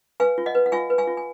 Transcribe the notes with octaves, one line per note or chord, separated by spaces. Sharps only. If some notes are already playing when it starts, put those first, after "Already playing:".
B4 F5 G#5
F4
D#5 F#5
B4
F#5
F4 F5 G#5
B4
F5 G#5
F4
G#5